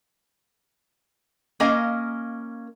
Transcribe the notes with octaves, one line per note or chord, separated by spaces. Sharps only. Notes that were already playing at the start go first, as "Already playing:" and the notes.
A#3 C#4 A#4 D#5 F5 G#5